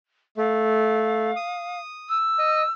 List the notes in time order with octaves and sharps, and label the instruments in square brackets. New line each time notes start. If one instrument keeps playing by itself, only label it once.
[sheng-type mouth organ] A3 [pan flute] F5
[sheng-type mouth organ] D#6
[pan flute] E6
[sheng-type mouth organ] D#5